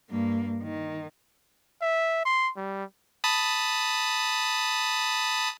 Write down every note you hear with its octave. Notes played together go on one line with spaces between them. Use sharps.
G2 A#3
D#3
E5
C6
G3
A5 B5 D#6